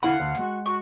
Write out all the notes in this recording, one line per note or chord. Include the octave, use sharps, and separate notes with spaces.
D3 E4 F5 F#5 B5
D2
G#3 F#4
F#4 C#6